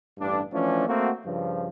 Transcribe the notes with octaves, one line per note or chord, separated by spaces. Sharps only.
A1 G2 D4
E3 F3 A3 C#4 D4
A3 A#3 C4 F#4
G2 C#3 F3